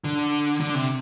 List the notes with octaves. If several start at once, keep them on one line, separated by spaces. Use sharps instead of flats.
D3
D3
C3